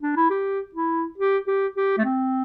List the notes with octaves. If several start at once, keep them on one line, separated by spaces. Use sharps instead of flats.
D4
E4
G4
E4
G4
G4
G4
A3
C4